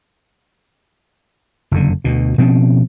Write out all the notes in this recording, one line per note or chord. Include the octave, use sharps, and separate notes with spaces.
F#1 F2 D3
D2 B2
B2 F3 C4 C#4